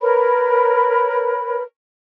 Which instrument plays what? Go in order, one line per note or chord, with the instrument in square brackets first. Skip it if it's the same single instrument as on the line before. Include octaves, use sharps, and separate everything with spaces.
[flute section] A#4 B4 C#5 B5